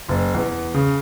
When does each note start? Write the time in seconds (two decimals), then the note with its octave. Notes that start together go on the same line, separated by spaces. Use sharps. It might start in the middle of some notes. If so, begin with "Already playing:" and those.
0.09 F#1
0.34 E2
0.74 C#3